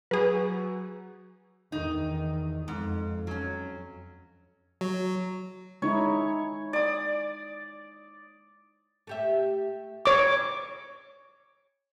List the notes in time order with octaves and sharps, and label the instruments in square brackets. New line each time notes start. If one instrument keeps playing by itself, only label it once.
[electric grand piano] F#3 F#4 [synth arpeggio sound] G#4 B4
[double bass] E2 D#3 [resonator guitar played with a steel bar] D#4
[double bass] F2 [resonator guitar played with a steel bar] G#2
[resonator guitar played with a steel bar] F#3 C#4
[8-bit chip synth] F#3
[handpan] G#3 D#4 E4 [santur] C#5
[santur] D5 D#6
[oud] A3 G4 E5
[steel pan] C#5 D6